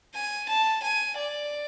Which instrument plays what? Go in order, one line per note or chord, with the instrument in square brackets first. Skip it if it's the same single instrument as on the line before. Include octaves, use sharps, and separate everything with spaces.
[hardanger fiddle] G#5
A5
G#5
D5